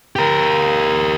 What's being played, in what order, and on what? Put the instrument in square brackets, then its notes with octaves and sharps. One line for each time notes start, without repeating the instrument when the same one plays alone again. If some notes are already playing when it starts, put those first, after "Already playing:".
[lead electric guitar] G4 A#4